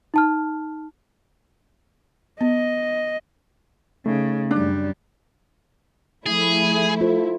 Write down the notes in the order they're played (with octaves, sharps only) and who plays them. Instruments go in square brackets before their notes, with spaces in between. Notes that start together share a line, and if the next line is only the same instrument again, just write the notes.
[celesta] D#4 A5 F6
[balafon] B3 [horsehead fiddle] D#5
[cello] C#3 [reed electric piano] A3 D#4
[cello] F#2 G3 [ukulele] D4
[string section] F3 A3 E4 [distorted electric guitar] G#4
[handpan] F4 A4 C5